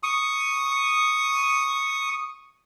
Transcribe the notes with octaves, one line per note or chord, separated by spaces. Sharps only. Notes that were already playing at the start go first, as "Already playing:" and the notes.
C#6 D#6